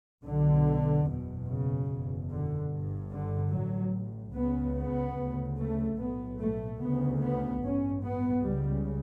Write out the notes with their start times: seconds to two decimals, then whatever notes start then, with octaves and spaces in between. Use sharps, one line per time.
0.24 B1 B2 D3
1.07 F#1 E2 B2
1.47 C#3
1.89 F#1 E2 B2
2.29 D3
2.70 G1 G2
3.11 D3
3.53 A1 A2 F#3
4.34 C#2 C#3 B3
4.76 B3
5.16 D2 C#3
5.57 A3
5.98 B1 A2 B3
6.40 A3
6.81 D2 C#3 B3
7.21 B3
7.62 A1 G2 C#4
8.03 B3
8.44 C#2 C#3 G3